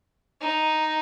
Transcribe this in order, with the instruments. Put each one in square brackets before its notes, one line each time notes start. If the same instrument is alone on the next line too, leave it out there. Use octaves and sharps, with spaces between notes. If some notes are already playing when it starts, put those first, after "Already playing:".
[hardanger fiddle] D#4